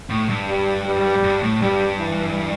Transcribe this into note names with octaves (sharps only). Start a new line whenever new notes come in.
A2
G2
G3
G3
G2
A2
G2 G3
E3